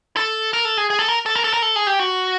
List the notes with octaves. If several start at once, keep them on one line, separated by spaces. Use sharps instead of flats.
A4
A#4
A4
G#4
G#4
A4
A#4
A4
A#4
A4
A#4
A4
G#4
G4
F#4